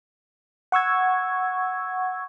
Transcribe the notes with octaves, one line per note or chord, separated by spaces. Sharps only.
F#5 C#6 E6 G#6